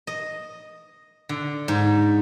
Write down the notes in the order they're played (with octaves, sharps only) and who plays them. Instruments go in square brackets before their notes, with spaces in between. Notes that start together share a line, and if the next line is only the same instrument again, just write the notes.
[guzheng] D#5
D3
G#2